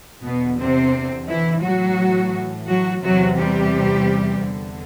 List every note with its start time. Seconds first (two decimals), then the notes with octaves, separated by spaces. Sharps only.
0.22 E2 B2 D3 B3
0.58 C3 C4
1.27 E3 E4
1.62 A2 E3 F#3 F#4
2.68 F#3 F#4
3.02 E2 C3 E3 F#3 F#4
3.38 G3 G4
4.43 E2 D3